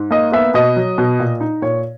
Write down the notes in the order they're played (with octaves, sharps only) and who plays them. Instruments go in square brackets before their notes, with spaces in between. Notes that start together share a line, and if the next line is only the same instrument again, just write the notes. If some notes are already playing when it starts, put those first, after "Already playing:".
Already playing: [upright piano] G#2
A#3 D#5
B3 E5
B2 D#5
F#3
B2
A#2
D#4
A#2 C#5